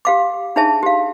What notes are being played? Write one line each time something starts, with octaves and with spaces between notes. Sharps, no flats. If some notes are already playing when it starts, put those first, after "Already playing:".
G4 F5 D6
D4 D#4 G#4 C#5 E5 A5
G4 F5